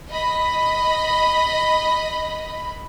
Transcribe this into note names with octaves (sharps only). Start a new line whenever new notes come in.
D#5 B5